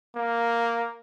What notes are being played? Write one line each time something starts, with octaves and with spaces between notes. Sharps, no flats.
A#3